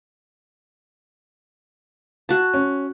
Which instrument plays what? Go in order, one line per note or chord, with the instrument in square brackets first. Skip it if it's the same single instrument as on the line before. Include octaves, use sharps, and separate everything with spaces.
[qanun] F#4 A5
[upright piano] C#4